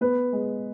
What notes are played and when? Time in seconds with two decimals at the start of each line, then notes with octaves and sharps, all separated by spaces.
0.01 B3 B4
0.33 G#3